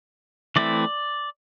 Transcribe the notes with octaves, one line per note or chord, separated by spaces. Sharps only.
E3 A3 C4 E4 D5